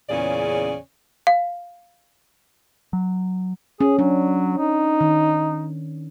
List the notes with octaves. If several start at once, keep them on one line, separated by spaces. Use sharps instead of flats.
E2 A#2 C#3 C#4 G#4 D5
F5
F#3
C#4 G#4
F#3 D4
D#4
D#3